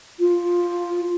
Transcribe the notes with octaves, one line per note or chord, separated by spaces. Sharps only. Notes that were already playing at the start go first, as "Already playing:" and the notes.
F4